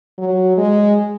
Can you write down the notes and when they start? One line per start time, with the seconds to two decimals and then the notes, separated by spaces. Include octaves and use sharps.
0.18 F#3
0.58 G#3